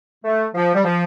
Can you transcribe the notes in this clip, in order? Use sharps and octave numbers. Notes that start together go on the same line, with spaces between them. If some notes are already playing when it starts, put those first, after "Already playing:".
A3
F3
G3
F3